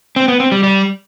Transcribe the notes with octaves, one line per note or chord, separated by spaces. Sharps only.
C4
B3
C4
G3
G3